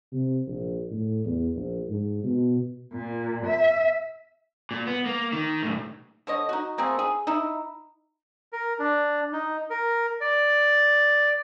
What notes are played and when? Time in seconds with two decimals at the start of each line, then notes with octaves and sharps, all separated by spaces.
0.12 C3
0.47 A#1
0.91 A2
1.25 E2
1.55 A#1
1.88 G#2
2.24 B2
2.94 A#2
3.48 E5
4.71 A#2
4.87 B3
5.06 A#3
5.33 D#3
5.63 B1 A2
6.27 D3 C#5 D#5
6.49 D#4 F#4
6.78 A3 A#3 C4 G#4
6.99 G#4
7.27 D#4 E4
8.53 A#4
8.79 D4
9.32 D#4
9.70 A#4
10.21 D5